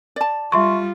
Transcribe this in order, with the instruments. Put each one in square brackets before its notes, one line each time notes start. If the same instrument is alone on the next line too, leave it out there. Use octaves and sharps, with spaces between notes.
[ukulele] D5 A5
[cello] G3 F4 [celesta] E5 C6 C#6